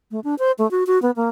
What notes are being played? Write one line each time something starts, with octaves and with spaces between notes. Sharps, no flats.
A3
D4
C5
A3
F#4
F#4
B3
A#3